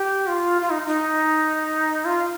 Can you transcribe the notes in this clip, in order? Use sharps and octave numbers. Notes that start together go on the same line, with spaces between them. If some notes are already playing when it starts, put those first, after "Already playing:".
Already playing: G4
F4
F4
D#4
D#4
F4